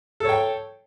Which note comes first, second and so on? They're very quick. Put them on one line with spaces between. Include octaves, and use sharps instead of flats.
A4 C#5 G5